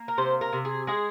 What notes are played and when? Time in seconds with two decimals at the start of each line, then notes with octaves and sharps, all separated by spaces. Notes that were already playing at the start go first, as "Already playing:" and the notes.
Already playing: A#3
0.08 A#4
0.18 C3 C5
0.41 A#4
0.53 C3
0.65 G#4
0.87 G#3 G#4